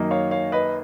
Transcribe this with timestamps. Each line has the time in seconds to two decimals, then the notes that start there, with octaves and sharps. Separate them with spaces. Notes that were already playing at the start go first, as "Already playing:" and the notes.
Already playing: F#2 D#3 A#3 D#4
0.11 C#5 F5
0.31 C#5 F5
0.52 B4 D#5